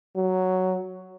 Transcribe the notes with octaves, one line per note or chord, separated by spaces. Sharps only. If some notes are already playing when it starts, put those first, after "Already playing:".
F#3